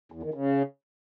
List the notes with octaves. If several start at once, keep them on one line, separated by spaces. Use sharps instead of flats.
E2
D#3
C#3